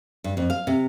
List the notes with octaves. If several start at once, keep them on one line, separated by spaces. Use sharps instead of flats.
G2
F2
F5
C3